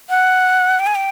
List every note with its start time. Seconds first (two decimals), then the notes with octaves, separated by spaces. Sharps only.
0.09 F#5
0.80 G5
0.87 G#5
0.95 G5